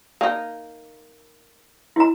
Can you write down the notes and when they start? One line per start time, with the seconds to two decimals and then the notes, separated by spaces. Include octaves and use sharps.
0.21 A#3 D#4
1.96 E4 A#5